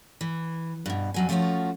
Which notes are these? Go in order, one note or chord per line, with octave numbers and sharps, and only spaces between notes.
E3
G2 B2
F2 F#3 G#5
F3 A3 B3 C#4 F4 F#4